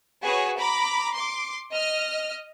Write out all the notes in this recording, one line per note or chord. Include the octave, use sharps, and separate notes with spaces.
F#4 G#4 B4 C#5
A#5 B5 D6
C6 D6
D#5 F6